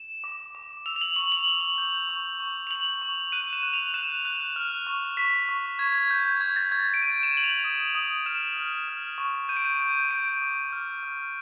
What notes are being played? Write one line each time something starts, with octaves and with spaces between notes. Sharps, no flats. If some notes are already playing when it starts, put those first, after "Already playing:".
Already playing: E7
D6
D6
E6 F7
F7
F#7
C#6 F#7
F#7
E6 G7
G6
C#6
C#6
F7
G6 F#7
C#6
F#6 D#7
E7
F#6
F7
F#6 E7
F#6
F6
C#6
C#6 B6
C#6
C#6 G#6
G#6
G6
G6
C#6 G#6
A6
C#6 G#6
D7
G6 D#7
E7
G6 F#7
F7
D#6
D#6
F6 E7
F6
F6
C#6
G6 D#7
D7
D#7
G6
G6 D7
D6
F6
F6